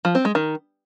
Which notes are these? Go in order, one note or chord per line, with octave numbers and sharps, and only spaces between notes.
F3
C4
G#3
D#3